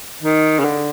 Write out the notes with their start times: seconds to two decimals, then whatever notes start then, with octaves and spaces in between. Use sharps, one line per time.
0.23 D#3
0.59 C#3
0.64 D3